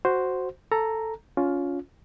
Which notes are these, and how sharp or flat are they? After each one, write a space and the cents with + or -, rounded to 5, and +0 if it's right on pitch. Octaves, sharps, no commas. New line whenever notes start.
F#4 +0 C5 +0
A4 +5 A#5 +0
C#4 +20 F4 +15